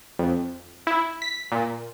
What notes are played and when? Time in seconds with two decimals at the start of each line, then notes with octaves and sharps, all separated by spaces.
0.19 F2
0.87 E4
1.22 B6
1.52 A#2